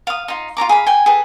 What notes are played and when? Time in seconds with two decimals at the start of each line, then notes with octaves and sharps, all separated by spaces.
0.07 F5 D#6
0.28 D#4 F4
0.57 F4 A4 A#5 D6
0.69 G#4 F5 B5
0.86 G5 G#5
1.06 G#4 A4 B4